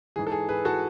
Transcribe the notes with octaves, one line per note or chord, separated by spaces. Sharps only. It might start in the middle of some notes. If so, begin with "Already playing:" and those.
G#2 E3 G#4
A4
G#4
G#4 B4
E3 F#4 A4